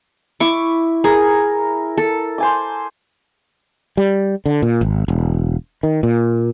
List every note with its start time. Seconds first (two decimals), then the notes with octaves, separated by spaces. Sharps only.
0.40 E4 C#6 D6
1.04 G#4 A#4
1.98 A4
2.38 C5 G#5 D6
3.97 G3
4.46 D3
4.62 A#2
4.81 G#1
5.08 E1
5.83 D#3
6.03 A#2